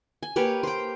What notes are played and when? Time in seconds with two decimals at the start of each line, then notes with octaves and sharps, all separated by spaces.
0.23 G#5
0.36 A#3 G4 B4 C#5
0.63 C5 G5